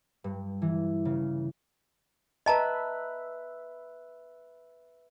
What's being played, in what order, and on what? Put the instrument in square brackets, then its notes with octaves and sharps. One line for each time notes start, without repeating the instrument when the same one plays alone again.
[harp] G2
E3
C#3
[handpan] B4 E5 [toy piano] D#5 A5 A#5